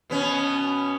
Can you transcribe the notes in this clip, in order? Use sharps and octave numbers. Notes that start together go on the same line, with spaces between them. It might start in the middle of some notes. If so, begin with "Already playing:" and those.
B2 B3 C#4